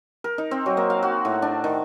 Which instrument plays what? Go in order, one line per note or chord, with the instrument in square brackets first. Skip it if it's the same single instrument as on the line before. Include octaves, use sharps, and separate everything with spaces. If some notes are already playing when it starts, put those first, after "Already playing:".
[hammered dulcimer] A#4
D#4
C4
F#3
A#3
F5
F#4
A2
D4
D#3